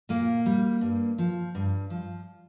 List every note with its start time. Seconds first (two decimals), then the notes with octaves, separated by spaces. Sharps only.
0.09 A#2 A#3
0.46 G3
0.81 G2
1.18 F3
1.55 G2
1.90 F3